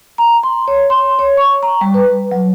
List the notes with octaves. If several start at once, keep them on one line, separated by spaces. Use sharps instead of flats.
A#5
C6
C#5
C6
C#5
C#6
A#5
G3
B4
F#3